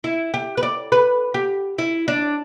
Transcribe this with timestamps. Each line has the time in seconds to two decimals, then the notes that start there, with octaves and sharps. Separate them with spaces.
0.04 E4
0.34 G4
0.57 B4
0.63 D5
0.92 B4
1.34 G4
1.78 E4
2.08 D4